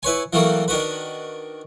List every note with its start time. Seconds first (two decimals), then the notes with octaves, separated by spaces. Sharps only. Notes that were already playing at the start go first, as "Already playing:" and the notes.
0.03 E4 B4 C#5 G#5
0.33 E3 F#3 G3 A3 A#3 F#4
0.68 D#3 D4 F#4 B4